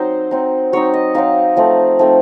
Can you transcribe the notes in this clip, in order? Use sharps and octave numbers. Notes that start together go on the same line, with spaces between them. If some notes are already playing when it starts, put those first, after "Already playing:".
Already playing: F#3 C4 D#4 C5
F#3 C4 D#4
F#3 C4 D#4 C#5
D#5
F#3 C4 D#4 F5
F3 A3 C4 D#4
F3 A3 C4 D#4